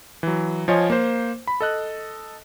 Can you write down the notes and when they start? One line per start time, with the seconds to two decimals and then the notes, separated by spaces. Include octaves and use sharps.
0.23 E3 F#3
0.68 F3 F4 C#5 D#5 G#5
0.90 A#3 C5
1.47 B5
1.61 A4 D#5 F#6